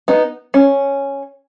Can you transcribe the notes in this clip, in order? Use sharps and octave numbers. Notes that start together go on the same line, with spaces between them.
B3 D#4
C#4